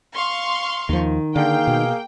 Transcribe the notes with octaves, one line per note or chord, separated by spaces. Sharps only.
F5 C6 C#6
D#2 D#3 F3
D3 A#3 G#4 F5 G5
B2